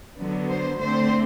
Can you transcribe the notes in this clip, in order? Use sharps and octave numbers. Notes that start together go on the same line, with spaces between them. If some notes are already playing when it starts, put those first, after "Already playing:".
D3 F#3 B3
C5
D3 A3 C4 C5